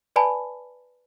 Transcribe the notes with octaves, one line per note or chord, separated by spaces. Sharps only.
B4 D5 G#5 A5 B5